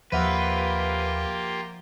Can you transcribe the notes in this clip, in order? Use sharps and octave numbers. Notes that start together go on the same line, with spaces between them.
D#2 F3 A#3 F4 G4 B4 E5 F#5